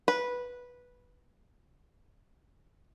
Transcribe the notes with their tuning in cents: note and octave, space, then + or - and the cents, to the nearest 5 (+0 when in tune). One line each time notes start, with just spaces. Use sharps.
B4 -10